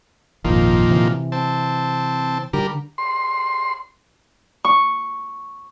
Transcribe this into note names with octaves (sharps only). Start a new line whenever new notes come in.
G#1 F2 A#2 D#3 F3
C3 E3
C4 A5
D3 G3 A#4
C6
C#6